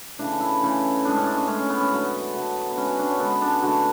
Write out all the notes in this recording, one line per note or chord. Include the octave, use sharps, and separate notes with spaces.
C#3 E3 A3 D4
E4
C#3 E3 A3
A2 G#3 D4
C#4
D4
C#4
A2 G#3 C#4
C#4
B3
C#4
D3 F#3 A3 B3
D3 F#3 A3
B3
D3 G#3 C#4
F#4
D4
C#4
D3 G#3 B3
D4
D3 A3 F#4